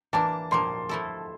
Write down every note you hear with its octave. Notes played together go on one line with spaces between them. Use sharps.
E3 A#3 D4 A5
A#2 F3 A#3 C6
F3 A3 E4 A4